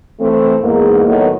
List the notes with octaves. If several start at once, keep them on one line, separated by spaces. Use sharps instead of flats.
E3 A3 C4
E2 G#2 A#3
A2 D#3 F#3 A3 B3 D#4